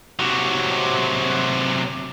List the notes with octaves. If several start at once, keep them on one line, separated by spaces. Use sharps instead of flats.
C3 F#3